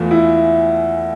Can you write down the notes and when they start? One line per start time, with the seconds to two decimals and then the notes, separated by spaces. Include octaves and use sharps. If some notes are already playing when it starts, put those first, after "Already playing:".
Already playing: E2 E3 A3 F4
0.11 E4